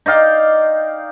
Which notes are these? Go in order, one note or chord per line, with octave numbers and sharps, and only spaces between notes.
D#4 D5 F5 G5